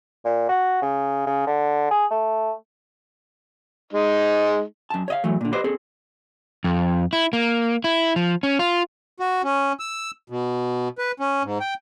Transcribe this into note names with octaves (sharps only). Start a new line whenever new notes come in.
A#2
F#4
C#3
C#3
D3
G#4
A3
G#3 D#4
F#2 A5
C#5 D#5 F5
E3 F#3 A3
A#2 D3
G4 B4 C5 D5 D#5
C4 G#4 A4
F2
E4
A#3
E4
F3
C#4
F4
F#4
C#4
E6
B2
B4
C#4
G#2
G5